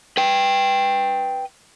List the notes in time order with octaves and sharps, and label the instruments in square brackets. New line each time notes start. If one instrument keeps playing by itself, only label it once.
[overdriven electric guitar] B4 G5